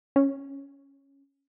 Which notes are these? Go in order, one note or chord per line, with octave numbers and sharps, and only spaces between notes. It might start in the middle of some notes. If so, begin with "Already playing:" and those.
C#4